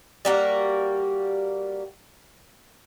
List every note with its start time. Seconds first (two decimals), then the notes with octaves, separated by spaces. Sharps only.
0.25 G3 A#3 F#4